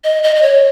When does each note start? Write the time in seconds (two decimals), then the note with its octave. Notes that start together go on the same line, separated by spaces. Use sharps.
0.04 D#5
0.23 D#5
0.36 D#5
0.42 C#5